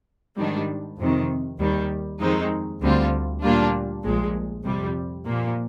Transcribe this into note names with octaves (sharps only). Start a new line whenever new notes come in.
G#2 D#3 G3 D4
F2 C3 D#3
D#2 D#3 G3
F2 D#3 G#3 C4 D#4
D2 D3 G3 C4 F4
A#2 G3 A#3 D4 F4
A#1 A#2 F3 G#3
F2 C3 G3
A#2 F3 A#3